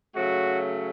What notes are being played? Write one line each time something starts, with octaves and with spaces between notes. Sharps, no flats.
C#3 F#3 A3 F#4